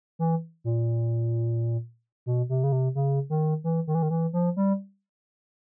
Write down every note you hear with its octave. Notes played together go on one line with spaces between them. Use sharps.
E3
A#2
B2
C3
C#3
C3
C#3
D#3
E3
D#3
E3
D#3
E3
F3
G3